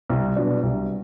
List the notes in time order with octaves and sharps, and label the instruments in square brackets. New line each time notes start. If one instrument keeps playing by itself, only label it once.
[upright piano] C2
B2 F#3 B3 D4
C2